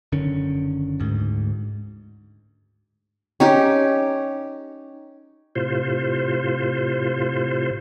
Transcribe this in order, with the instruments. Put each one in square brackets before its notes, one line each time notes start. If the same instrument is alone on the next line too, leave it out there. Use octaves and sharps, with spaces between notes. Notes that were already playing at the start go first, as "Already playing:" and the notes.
[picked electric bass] F#1 D3 D#3 C#4
D2 G#2
[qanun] C#4 D#4 G4
[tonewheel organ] A2 C3 F4 C5